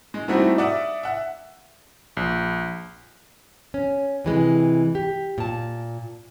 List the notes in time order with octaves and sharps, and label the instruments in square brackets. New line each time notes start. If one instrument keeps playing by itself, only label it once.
[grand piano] G#3
G3 A3 C4 D#4 E4 F#4
D5 E5 F#5 D#6
E5 F#5
[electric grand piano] A#1
[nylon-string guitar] C#4
C3 E3 G#3
G4
A#2 A5